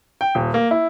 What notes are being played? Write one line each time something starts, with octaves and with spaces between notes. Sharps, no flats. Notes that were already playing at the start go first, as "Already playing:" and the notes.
G5
D#1
A#3
E4